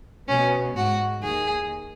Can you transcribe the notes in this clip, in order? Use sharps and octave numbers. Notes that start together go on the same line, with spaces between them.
B2 B3 C#4
G#2 G#3 F#4
D#2 D#3 G#4